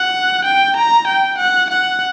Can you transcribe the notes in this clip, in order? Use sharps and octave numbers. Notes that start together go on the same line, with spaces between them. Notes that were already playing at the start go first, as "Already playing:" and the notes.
Already playing: F#5
G5
A#5
G5
F#5
F#5